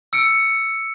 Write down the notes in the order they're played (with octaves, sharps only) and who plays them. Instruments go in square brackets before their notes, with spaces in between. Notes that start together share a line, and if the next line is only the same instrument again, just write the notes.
[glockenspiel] E6 C#7 D7